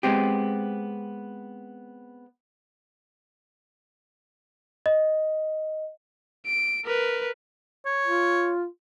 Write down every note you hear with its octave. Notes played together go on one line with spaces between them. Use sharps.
G#3 B3 C4 G4
D#5
D7
A#4 B4
C#5
F4